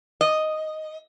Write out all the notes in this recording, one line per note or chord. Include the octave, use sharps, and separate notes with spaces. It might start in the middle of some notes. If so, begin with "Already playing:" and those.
D#5